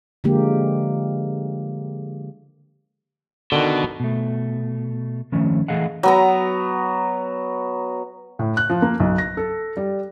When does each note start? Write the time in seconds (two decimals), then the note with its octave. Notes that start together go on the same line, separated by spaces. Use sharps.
0.24 D3 F3 G#3 A#3 G4
3.52 B2 D3 D#3
4.00 B2 A3
5.32 D#3 F3 A3 C#4
5.68 E3 A3 G#4 D#5 F5 F#5
6.03 F#3 B3 A#5
8.39 A2
8.57 F#6
8.70 F3
8.82 A#3
9.00 B1
9.18 A#6
9.37 A4
9.77 G3